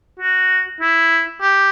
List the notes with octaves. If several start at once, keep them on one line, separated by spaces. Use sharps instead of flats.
F#4
E4
G4